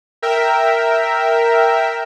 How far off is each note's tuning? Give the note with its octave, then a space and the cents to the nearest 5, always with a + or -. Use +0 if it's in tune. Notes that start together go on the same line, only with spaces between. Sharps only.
A#4 +0 E5 +0 G5 +0